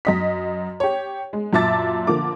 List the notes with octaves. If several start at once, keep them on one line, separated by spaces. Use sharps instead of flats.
F#2 D#5 B6
G4 C#5
G#3
F#2 A#2 E5 A5 D6 A6
D3 F3 A#3 D6